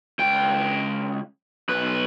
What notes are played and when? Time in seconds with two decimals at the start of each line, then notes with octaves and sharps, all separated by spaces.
0.19 C#2 G5
1.69 B1 B4